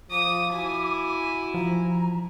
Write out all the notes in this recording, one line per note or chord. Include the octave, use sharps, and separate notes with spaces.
F3 D6 D#6
E4 F#4 G#5
F3 A#5